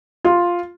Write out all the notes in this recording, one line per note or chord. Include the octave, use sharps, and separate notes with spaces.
F4